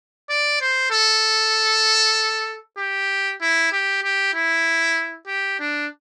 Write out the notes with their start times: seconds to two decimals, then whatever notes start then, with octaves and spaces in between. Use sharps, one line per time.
0.29 D5
0.61 C5
0.91 A4
2.78 G4
3.41 E4
3.72 G4
4.03 G4
4.34 E4
5.27 G4
5.59 D4